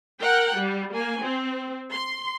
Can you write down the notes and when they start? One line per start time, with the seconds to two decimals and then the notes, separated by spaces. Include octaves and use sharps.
0.20 A#4 F#5 G5
0.56 G3
0.93 A#3 G#5
1.23 C4
1.91 C6